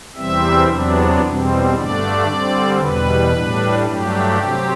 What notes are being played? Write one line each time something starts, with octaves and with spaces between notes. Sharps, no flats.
E2 C3 E3 G3 C4 E5
E2 C3 F#3 B3 D4
E2 B2 G3 C4
G2 D3 A3 D4 D5
D3 G3 C4
E2 B2 G3 B4
A2 G3 D4
G2 F#3 A3 D4 G4
C3 F#3 C4